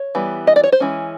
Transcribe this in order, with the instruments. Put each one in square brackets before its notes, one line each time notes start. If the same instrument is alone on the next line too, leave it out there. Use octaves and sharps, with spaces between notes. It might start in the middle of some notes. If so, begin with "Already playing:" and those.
Already playing: [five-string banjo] C#5
E3 G3 B3
D#5
D5
C#5
C5
E3 G#3 C#4